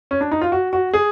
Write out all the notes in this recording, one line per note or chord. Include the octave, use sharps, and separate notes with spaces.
C#4
D4
D#4
F4
F#4
F#4
G#4